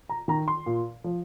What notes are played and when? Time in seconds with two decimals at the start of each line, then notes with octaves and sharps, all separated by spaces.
0.09 A#5
0.28 D#3 A#5
0.48 C6
0.66 A#2
1.04 F3